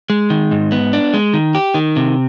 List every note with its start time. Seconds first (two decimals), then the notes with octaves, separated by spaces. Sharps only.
0.10 G#3
0.30 D#3
0.51 G#2
0.72 B3
0.93 D4
1.14 G#3
1.34 D#3
1.55 G4
1.74 D#3
1.96 C3